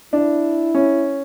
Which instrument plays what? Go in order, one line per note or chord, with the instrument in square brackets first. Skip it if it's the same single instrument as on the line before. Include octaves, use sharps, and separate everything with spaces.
[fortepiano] D4 [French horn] E4
[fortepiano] C#4